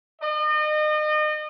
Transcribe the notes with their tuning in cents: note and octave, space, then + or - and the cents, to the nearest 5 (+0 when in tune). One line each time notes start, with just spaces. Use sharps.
D#5 -35